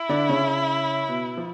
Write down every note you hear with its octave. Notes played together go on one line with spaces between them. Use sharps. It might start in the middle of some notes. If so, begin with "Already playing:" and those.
Already playing: E4
D3 D4
C#3 C#4
B2 B3
F3